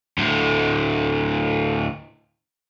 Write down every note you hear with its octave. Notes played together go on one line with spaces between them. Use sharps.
D2 A2